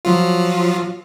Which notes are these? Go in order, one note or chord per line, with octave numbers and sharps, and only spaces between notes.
F3 F#3 F4